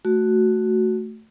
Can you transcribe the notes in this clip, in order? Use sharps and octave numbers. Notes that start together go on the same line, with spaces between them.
A3 F#4